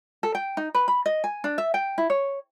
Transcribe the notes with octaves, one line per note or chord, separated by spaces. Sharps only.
A4
G5
D#4
B4
B5
D#5
G#5
D4
E5
G5
E4
C#5